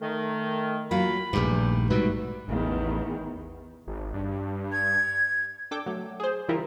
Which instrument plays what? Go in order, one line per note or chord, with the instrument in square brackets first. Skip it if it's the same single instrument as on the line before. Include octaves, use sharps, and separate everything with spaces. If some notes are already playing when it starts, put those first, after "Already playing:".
[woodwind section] D#3 [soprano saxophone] A3
[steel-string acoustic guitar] F#3 A#3 F4 [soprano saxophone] B5
[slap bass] A#1 G2 [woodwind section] E2 G4 [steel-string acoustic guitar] D#3 A3
[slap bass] G#2 B2 G3 [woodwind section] F#4 E5 [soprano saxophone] B4
[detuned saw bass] A1 [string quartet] E2 D#3
[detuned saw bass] G#1
G2
[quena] G#6
[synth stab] D4 A4 G5 D6
F#3 A3
G#4 C5
C#3 E3 G3 E4 F4 A#4